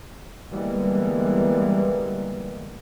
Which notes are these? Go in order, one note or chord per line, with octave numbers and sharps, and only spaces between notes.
D3 E3 G3 G#3 A#3 B3